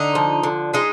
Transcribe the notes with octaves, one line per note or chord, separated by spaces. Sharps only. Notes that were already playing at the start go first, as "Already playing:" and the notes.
Already playing: D3 D#4
F3
D3
G#3 D#4